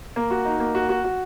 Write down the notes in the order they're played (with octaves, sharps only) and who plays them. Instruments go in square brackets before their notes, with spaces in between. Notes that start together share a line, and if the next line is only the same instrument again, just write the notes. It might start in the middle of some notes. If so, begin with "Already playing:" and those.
[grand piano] A#3
F#4
D#4
A#3
F#4
F#4
F#4